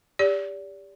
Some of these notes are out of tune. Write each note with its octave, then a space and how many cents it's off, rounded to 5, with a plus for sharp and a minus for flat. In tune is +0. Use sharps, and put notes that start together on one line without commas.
G4 +30 D5 -30